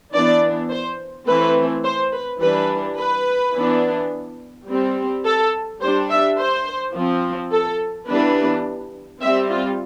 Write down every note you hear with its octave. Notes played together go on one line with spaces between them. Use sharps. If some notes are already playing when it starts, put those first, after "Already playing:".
E3 B3 D4 D5
C5
E3 A3 C4 B4
C5
B4
E3 G3 D4 B4
B4
E3 B3 D4
G3 C4
A4
G3 D4 C5
E5
C5
F3 C4
A4
E3 G3 B3 D4 B4
G3 C4 E5
F4